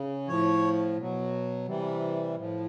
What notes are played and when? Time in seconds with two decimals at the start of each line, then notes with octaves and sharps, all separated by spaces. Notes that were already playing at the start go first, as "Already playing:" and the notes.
Already playing: C#3
0.28 A2 F3 C#5
0.97 B2 F#3
1.66 C3 E3 G3
2.36 A2 F3